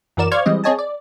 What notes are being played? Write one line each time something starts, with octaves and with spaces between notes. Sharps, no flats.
F#2 E3 F#4 A#4 D5 E7
C5 D5 F5 C#6 F6 G#6
E3 G3 G#3 C4 D#5
C4 G#4 C#5 D#5 G#5 A5
D5